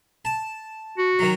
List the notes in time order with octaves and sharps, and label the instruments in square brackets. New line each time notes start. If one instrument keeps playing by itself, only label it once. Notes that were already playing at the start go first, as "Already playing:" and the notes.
[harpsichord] A5
[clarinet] F#4
[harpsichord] D#3 F#3